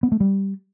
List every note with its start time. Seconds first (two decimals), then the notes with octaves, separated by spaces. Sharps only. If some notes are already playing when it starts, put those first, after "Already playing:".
0.03 B3
0.12 A3
0.20 G3